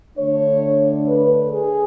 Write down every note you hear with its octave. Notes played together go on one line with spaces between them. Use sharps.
D3 A3 D4 C#5
B4
G#4